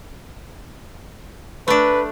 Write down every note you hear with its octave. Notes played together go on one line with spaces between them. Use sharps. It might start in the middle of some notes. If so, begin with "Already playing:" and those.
A3 D4 B4